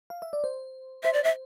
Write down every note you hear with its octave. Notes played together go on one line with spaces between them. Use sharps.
F5
E5
D5
C5
C5 E5
D5
E5